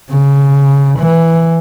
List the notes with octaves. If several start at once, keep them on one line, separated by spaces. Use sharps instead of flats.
C#3
E3